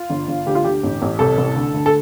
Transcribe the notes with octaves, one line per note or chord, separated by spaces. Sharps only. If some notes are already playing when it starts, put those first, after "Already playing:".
Already playing: F4
G1
G1
D2 G4
F4
D2 G4
A1
A1
C2 A4
C2
D2
D2
A4